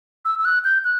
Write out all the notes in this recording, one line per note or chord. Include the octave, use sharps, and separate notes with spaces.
E6
E6
F#6
G6
F#6